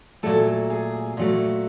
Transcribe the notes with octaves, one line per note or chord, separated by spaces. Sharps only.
A#2 F#3 A3 A4
G#4
A#2 F#3 A3